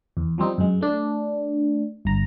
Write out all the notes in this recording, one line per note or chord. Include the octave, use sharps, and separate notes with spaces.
E2
F3 G3 C4 D#4
F#2 G#3
A3 D4
G1 A#5